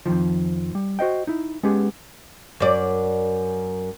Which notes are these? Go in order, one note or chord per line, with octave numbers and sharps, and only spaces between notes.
F2 A2 D#3 F3
G3
F#4 C5 D#5 G5
D#4 E4
G#3 B3 C#4 G4 G#4
F#2 D5